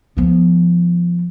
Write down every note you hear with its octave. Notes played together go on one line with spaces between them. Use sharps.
F3 B3